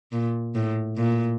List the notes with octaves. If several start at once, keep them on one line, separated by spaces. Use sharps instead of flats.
A#2
A2
A#2